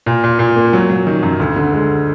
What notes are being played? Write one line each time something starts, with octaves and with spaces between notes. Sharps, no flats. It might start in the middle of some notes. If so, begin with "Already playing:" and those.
A#2
A#2
A#2
A#3
F#3
F#3
D#3
F#2
D2
D3
G#3